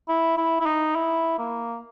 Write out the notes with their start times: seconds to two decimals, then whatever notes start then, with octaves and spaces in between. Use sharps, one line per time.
0.08 E4
0.37 E4
0.60 E4
0.66 D#4
0.95 E4
1.39 A#3